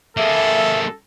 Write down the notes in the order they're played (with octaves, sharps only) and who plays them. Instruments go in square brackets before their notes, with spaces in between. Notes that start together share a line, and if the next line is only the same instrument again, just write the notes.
[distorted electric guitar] A#3 G#4 [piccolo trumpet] A4 [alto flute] E5